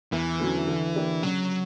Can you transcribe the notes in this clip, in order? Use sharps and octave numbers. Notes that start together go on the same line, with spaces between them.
E2 E3
D3 F#3 C#4
D3
A#3 D4 G4
C#3 F#3